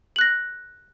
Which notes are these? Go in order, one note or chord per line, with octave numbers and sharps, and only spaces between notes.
F#6 A#6 F#7